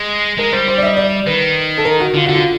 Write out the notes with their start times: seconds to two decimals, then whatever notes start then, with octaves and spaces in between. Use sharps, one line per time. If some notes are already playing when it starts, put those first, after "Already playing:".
Already playing: G#3
0.38 G#3 A#4
0.53 G3 C5
0.68 C5
0.78 D5
0.82 E5
0.87 D#5
0.97 D5
1.27 D#3 B4
1.78 A4
1.85 A#4
2.00 F#4
2.14 D3 F4
2.26 D3 F#4
2.35 F4